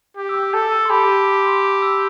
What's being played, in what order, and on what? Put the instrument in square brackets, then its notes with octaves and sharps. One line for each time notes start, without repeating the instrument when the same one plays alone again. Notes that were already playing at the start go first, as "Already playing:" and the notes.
[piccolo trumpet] G4
[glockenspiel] E6
D6
[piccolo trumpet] A4 [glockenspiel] A5
[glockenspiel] A5
C6
[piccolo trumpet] G4 [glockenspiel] B5
[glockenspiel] A5
C6
D6
E6